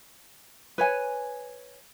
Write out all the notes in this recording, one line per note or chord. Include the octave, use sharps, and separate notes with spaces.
B4 C#5 G#5